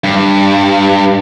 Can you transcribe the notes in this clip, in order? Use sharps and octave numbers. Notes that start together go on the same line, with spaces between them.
G2